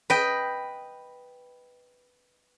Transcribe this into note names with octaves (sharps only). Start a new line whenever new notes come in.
B4 D#5 G5